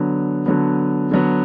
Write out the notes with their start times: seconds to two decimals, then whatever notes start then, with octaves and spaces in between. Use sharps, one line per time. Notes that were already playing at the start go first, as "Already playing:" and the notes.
Already playing: D3 F#3 B3
0.46 D3 F#3 B3
1.11 D3 F#3 B3